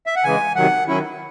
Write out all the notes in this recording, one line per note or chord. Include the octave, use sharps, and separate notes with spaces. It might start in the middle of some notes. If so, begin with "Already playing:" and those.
E5
F#5
C#3 E3 G#3 G#5
C3 D#3 F#3 F#5
D#3 F#3 C#4 E4